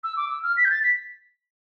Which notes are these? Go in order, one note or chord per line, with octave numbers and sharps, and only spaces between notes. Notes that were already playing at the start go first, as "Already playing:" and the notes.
E6
D6
E6
F6
B6
G6
A6
B6